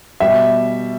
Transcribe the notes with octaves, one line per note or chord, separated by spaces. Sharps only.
B2 G3 E5